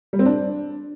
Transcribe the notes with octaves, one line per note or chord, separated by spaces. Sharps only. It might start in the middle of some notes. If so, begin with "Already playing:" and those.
G3
C4
D4